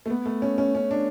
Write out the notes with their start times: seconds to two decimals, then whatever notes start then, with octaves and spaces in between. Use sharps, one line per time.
0.06 A3
0.10 B3
0.26 A3
0.42 C#4
0.58 C#4
0.75 C#4
0.91 D4